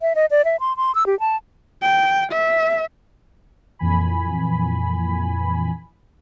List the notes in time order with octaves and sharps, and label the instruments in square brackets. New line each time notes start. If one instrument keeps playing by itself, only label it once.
[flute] E5
D#5
D5
E5
C6
C6
E6
G4
A5
[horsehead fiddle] G5
E5
[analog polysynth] F2 A#2 E3 G#5 B5